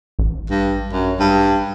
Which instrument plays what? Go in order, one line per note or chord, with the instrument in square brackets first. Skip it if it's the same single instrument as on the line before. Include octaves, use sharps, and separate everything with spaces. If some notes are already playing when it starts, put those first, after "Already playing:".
[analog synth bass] A1
[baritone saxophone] G2
F#2
G2